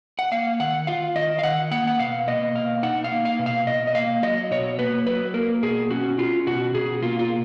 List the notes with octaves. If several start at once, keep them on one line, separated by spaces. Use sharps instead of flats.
F#5
A#3 F5
D#3 F#5
F4 F5
D#3 D#5
F5
D#3 F#5
A#3 F#5
F#5
B2 F5
A#3 D#5
B2 F5
D#4 F#5
F5
A#3
F5
B2
F5
B2 D#5
D#5
A#3 F5
F#3 D#5
B2 C#5
A#3 B4
F#3 B4
A#3 A#4
B2 G#4
C#4 F#4
C#4 F4
B2 F#4
B2 G#4
A#3 F4
F4